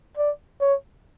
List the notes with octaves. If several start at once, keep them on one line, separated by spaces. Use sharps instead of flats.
D5
C#5